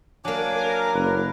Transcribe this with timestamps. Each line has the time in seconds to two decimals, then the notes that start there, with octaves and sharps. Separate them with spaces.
0.25 F#3 A#3 D4 G#5 D6
0.56 A#4
0.94 F#1 B4